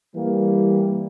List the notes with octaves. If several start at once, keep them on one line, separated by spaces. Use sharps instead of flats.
E3 G3 A#3